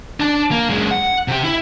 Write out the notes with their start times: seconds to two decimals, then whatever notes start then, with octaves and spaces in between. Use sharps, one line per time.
0.20 D4 A5
0.51 A#3
0.69 F#2 G#3
0.91 F#5
1.28 C3 G4
1.44 E4